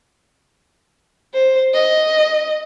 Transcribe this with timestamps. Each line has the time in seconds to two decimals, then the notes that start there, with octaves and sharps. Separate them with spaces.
1.33 C5
1.74 D#5